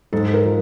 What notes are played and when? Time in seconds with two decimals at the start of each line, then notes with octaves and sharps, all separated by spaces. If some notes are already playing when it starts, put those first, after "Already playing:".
0.13 G#2 A4
0.34 A#4
0.45 F3